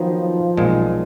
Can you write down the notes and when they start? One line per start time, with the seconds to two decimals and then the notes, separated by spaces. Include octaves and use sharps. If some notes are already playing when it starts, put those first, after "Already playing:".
Already playing: D#3 F3 F#3 B3 D#4
0.57 B1 A#2 G#3